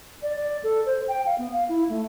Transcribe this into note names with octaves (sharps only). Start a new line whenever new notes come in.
D5
D5
A4
C5
G5
F5
B3
F5
E4
A3